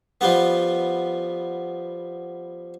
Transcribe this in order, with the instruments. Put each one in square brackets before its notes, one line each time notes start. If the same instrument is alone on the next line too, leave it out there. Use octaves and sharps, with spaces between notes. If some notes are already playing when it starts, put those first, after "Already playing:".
[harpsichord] F3 G3 B3